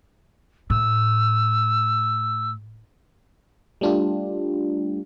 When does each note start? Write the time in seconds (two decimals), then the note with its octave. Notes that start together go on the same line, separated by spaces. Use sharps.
0.70 A2 E6
3.81 G3 A3 D4 F4 G4